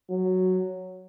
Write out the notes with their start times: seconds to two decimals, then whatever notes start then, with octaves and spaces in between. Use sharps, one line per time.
0.10 F#3